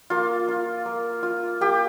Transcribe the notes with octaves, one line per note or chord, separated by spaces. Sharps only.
A#3 F4
F4
A#3
F4
A#3 G4